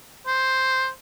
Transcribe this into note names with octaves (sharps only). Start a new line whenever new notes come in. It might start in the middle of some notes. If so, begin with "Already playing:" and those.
C5